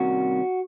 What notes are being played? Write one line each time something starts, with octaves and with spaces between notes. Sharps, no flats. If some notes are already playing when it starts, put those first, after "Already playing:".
Already playing: C3 D#3 G3 A#3 C#4 F#4